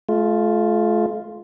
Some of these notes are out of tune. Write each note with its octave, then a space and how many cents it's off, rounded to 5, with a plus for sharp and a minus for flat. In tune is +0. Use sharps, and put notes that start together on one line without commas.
A3 -40 F4 +0